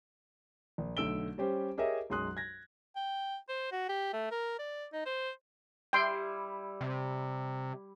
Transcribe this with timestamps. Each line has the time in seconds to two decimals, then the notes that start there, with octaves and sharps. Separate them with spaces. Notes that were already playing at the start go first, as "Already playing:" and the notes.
0.78 A#1
0.97 B1 D3 A3 E6 D7 G7
1.38 G3 C#4 G4 C5
1.78 G4 G#4 A#4 C#5 D#5 E5
2.10 B1 F#2 G#3 C6 D#6 F#6
2.37 G#6 A#6
2.96 G5
3.49 C5
3.72 F#4
3.89 G4
4.13 A3
4.31 A#4
4.59 D5
4.93 D#4
5.06 C5
5.93 G3 E4 G5 C6
6.81 C3